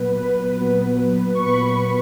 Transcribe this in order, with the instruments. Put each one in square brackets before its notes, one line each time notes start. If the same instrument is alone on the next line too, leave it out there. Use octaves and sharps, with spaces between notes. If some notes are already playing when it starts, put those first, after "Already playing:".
Already playing: [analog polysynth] A#2 F#3 B3 B4
B4
A#2 F#3 B3
C#6
A#2 F#3 B3 B5